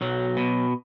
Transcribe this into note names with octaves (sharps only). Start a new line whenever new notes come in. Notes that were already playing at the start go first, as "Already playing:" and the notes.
B1 F#3
B2